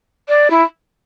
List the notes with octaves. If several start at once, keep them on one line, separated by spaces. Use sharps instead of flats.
D5
E4